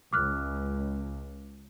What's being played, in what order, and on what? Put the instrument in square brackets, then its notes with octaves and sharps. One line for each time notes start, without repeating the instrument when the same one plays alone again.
[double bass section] C#2 [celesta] D6 F6 F#6